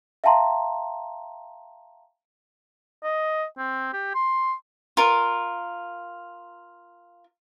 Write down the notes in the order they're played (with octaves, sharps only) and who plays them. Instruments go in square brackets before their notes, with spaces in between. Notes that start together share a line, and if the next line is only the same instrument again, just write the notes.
[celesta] E5 F5 G5 A5 A#5 C6
[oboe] D#5
C4
G4
C6
[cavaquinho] F4 A#4